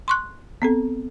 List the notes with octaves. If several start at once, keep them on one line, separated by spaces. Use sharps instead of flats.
C6 C#6 F#6
B3 C4 A4